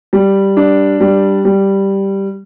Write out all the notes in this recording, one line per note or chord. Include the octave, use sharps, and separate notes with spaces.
G3
D4
G3
G3